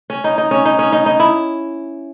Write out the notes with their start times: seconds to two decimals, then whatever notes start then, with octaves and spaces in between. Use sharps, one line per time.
0.10 C#4
0.24 D#4
0.38 D#4
0.51 C#4
0.65 D#4
0.79 C#4
0.92 D#4
1.06 D#4
1.20 E4